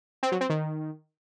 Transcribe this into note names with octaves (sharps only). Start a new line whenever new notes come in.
C4
F#3
C4
D#3